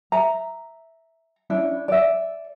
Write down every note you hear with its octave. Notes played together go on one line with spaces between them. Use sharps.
E5 A#5
C#4 D4 E4
D5 E5